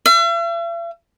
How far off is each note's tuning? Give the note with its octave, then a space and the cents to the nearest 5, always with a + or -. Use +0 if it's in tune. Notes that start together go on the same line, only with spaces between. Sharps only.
E5 +45